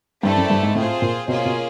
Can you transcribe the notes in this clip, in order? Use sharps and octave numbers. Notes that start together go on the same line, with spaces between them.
G2 A3 C4 E4 A4 D5
F#2
G2
G#2
A2 C4 F4 G#4 C5
A#2
B2 A#3 C#4 F4 G#4
B2